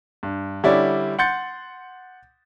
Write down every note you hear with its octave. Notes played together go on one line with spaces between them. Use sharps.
G2
D3 G3 C#4 E4 D5
F#5 C6 G6 A6 C#7